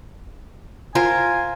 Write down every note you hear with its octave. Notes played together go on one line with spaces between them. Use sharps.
F4 A#4 C5 G#5